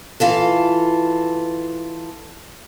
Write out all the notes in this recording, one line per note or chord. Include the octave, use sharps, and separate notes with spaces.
E3 F4 A4